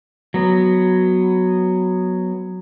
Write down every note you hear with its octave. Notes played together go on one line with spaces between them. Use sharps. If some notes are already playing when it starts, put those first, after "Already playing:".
F#3 B3